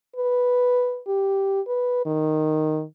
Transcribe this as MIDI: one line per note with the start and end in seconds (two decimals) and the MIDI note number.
0.16 1.00 71
1.07 1.61 67
1.67 2.04 71
2.06 2.83 51